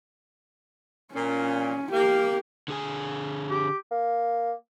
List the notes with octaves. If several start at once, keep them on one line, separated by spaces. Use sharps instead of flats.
A#2 C#4
A#3 G4
D3 G#4 G#5
G4
A#3